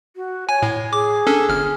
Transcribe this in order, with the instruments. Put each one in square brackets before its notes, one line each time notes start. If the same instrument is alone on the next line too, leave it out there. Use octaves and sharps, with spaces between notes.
[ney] F#4
[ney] C#5 [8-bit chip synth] G#5
[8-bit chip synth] A2
[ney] G#4 [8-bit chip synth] D6
[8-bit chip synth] C#4 D4 A4
G1 F6